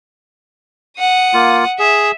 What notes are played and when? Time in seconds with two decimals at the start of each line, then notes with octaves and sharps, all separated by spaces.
0.99 F#5 D#6
1.34 A#3 F4
1.79 G#4 E5